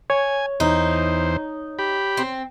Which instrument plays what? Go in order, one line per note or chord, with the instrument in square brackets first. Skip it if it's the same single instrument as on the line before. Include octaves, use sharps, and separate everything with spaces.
[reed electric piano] C#5 [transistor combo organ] G#5
[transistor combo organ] E2 C5 [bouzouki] D#4
[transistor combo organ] G4 B5
[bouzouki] C4